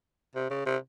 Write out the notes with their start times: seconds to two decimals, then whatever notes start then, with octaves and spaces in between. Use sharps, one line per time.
0.36 C3
0.50 C#3
0.66 C3